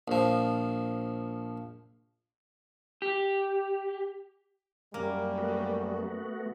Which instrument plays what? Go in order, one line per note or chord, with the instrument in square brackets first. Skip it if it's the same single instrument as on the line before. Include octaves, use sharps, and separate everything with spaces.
[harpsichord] A#1 F3
[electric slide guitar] G4
[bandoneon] F#2 [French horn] G3 [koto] A#3
[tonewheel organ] A3 B3 F#4